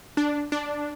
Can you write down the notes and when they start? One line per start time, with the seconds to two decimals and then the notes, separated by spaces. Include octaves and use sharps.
0.17 D4
0.52 D4